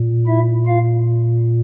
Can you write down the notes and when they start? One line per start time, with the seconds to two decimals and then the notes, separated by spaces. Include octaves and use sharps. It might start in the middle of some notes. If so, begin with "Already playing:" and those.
Already playing: A#2
0.27 E4 E5
0.66 F4 F5